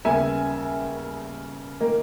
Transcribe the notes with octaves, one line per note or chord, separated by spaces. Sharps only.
D#2 C#3 G3 B3 E5 G#5
D#3 A#3